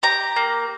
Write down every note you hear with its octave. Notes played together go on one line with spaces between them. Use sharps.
G4 A#5
A#3